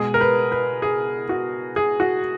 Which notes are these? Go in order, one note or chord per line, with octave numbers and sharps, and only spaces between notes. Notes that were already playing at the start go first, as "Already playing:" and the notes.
Already playing: B2 G#3 G#4
A#4
B4
B4
G#4
F#4
G#4
F#4